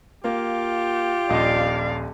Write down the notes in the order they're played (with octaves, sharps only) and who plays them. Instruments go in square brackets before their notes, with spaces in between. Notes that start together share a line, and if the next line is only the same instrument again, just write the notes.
[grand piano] A#3 [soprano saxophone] F4 [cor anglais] G4
[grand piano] D#1 A#1 D#5 [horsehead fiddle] D5 F5